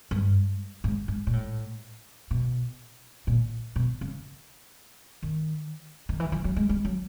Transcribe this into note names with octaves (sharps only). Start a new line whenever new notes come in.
G2
G#2
G#2
A#2
A2
B2
A#2
B2
C#3
D#3
D#3
E3
F3
F#3
G#3
G3
F#3